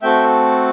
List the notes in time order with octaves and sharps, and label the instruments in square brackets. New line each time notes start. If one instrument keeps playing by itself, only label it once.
[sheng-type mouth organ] A3 C4 F#4 A4 E5 G5